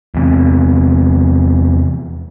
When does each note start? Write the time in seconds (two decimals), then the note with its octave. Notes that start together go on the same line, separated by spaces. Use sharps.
0.15 E2 C3